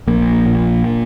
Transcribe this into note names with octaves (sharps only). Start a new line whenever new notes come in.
A#1 A#3
A#2